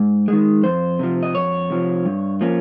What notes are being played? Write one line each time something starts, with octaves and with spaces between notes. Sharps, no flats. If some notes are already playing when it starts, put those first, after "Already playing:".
Already playing: G#2
D#3 G#3
F2 C5
C3 F3
D#5
F2 C#5
C3 F3
G2
F3 A#3 C#4